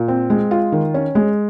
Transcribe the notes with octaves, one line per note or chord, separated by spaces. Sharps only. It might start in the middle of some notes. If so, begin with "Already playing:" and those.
Already playing: A#2
C4
G#3
F4
D#3
C#4
G#3